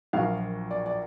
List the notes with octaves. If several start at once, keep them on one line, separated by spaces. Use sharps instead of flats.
A#1 A#2 F#3 F5
D5
D5